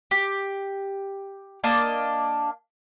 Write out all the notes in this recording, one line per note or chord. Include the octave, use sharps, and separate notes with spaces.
G4
A#3 D4 D#5 A5